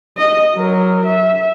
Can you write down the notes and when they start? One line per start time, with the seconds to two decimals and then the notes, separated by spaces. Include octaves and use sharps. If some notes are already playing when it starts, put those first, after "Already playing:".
0.18 D#5
0.56 F#3 A#4
1.06 E5